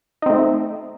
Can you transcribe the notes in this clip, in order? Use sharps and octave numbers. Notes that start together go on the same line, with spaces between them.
A3 C4 D#4